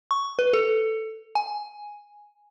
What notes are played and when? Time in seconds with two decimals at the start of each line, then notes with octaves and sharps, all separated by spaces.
0.11 C#6
0.39 B4
0.53 A4
1.35 G#5